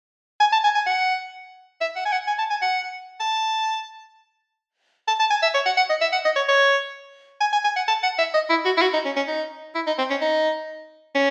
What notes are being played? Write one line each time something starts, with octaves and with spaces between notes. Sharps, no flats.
G#5
A5
G#5
G#5
F#5
E5
F#5
G#5
F#5
G#5
A5
G#5
F#5
A5
A5
A5
G#5
E5
C#5
F#5
F#5
D#5
E5
F#5
D#5
C#5
C#5
G#5
G#5
G#5
F#5
A5
F#5
E5
D#5
E4
F#4
E4
F#4
D#4
C#4
C#4
D#4
E4
D#4
C4
C#4
D#4
C#4